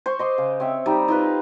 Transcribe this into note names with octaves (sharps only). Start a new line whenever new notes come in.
C5 C#6
D#5 C6 D6
C#3
C4 C#5 E5
G3 D#4
D#4 F4 B4